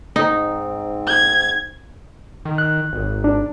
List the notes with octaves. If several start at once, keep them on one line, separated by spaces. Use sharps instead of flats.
G#2 C4 D#4
G#6
D#3
F#6
G#1
D4